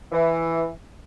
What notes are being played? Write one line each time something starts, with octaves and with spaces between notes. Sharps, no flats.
E3